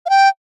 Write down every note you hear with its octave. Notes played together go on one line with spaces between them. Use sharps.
F5
G5